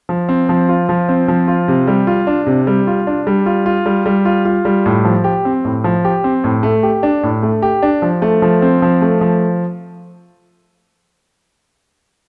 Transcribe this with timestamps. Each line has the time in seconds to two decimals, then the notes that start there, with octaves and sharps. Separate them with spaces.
0.09 F3
0.29 C4
0.49 F3
0.69 F4
0.89 F3
1.09 C4
1.28 F3
1.48 F4
1.68 C3
1.88 G3
2.07 F4
2.27 D4
2.46 C3
2.67 G3
2.87 F4
3.07 D4
3.27 G3
3.46 F4
3.66 F4
3.86 G3
4.06 G3
4.25 F4
4.45 F4
4.65 G3
4.86 A2
5.05 F3
5.24 G4
5.45 C4
5.65 A2
5.84 F3
6.05 G4
6.24 C4
6.44 A2
6.63 A3
6.83 G4
7.03 D4
7.23 A2
7.43 A3
7.62 G4
7.82 D4
8.02 F3
8.22 A3
8.42 F3
8.62 C4
8.82 F3
9.02 A3
9.21 F3